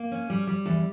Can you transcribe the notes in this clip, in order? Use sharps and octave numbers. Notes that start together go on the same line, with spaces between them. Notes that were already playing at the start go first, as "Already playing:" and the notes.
Already playing: A#3
C#4
G3
G3
E2